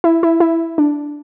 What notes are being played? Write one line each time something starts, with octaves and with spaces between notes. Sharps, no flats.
E4
E4
E4
D4